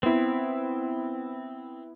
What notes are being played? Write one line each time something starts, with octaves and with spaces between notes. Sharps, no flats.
B3 C4 E4